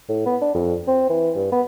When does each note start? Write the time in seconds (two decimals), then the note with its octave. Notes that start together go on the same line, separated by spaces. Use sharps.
0.09 A2
0.26 B3
0.41 D4
0.54 F2
0.87 C4
1.09 E3
1.35 G2
1.52 B3